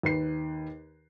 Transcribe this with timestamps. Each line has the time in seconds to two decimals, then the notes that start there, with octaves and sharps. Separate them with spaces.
0.03 D#2 B4 C7